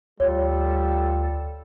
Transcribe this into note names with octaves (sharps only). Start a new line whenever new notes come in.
D2 G3 F4 A4 C#5